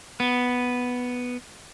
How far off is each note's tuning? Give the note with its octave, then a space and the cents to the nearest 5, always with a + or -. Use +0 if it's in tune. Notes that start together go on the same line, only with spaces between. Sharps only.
B3 +0